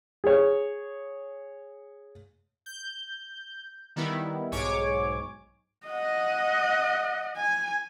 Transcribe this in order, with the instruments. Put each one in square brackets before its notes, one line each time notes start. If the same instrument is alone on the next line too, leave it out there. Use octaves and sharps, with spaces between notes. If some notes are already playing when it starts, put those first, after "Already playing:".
[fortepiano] G#4 C#5
[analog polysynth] G6
D#3 G3 B3 E4
B1 G#2 C#5 G#5 D6
[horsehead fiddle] D#5 F#5
G#5